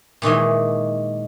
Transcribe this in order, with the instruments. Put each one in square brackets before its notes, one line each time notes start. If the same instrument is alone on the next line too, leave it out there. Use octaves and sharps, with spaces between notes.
[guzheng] A#2 D#3 E3 G#3